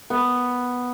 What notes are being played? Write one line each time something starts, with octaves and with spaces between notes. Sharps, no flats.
B3